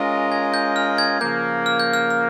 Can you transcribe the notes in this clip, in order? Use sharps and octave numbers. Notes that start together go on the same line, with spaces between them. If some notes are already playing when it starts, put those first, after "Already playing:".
Already playing: G#3 C#4 F4 A#4 D#5
G#6
G6
F6
G#6
C#3 F3 A#3 G6
F6
G6
F6
F6